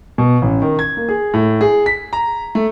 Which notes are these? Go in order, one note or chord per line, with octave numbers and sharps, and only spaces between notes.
B2
A1
D#3
G#6
A#3
G#4
A2
G#4
B6
A#5
A3